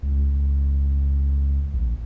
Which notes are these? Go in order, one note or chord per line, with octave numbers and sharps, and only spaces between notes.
C#2
A#1